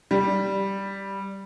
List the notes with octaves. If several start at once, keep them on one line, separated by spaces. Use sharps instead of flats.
G3